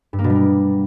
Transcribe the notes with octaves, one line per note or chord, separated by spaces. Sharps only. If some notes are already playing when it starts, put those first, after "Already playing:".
G2
A#3
B2
G3
A#3